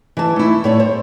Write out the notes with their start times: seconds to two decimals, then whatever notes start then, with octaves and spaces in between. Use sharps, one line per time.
0.17 E3 A5
0.36 A3 E4
0.64 A2 C#5 D5
0.80 C5